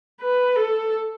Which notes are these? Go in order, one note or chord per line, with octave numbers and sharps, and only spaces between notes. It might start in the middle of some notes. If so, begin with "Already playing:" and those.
B4
A4